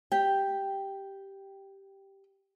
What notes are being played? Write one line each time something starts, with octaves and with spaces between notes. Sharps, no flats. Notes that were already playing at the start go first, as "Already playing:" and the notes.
G4 G5